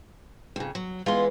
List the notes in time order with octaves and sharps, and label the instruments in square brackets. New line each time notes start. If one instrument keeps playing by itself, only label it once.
[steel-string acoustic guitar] F2 C#3
F#3
[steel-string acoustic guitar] E3 G#3 B3 [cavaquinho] F4 C6